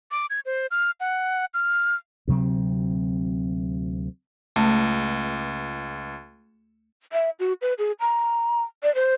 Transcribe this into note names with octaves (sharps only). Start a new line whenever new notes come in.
D6
G#6
C5
F6
F#5
F6
D2 C3 F#3 C4
C#2 A3
E5
F#4
B4
G#4
A#5
D5
C5